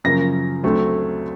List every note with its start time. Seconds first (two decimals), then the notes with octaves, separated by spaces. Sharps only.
0.04 F#2 C#3 F3 A#3 A#6
0.63 D2 D3 F#3 A3 C4